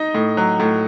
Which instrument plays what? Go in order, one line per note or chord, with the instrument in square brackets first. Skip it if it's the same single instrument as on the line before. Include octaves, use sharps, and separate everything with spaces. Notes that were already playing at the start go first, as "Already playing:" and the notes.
Already playing: [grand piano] D#4 D#5
A2
F#3
A2